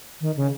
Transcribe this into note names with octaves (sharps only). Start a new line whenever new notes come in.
D#3
C#3